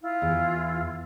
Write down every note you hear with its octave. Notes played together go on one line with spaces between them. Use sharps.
E4 F4
E2